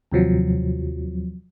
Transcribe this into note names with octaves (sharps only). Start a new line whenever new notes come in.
D#2 C3 F3 F#3